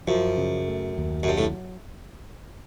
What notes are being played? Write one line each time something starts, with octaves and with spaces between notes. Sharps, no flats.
F#2 F3
C#3
A3
D#2
F#2
G2 F#3
A2